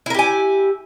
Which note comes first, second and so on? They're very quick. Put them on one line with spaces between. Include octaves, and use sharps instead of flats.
E4 A#4 G4 G#5